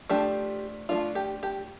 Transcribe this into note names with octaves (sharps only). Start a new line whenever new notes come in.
F3 A3 D4 G4
F3 A3 D4 F4
G4
G4